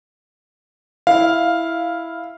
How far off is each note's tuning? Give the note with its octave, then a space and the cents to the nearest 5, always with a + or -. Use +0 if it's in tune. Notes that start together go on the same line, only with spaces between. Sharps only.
E4 +0 F5 +0